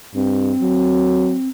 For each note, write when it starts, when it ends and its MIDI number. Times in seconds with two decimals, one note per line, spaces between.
0.15 0.53 43
0.15 1.49 60
0.60 1.35 54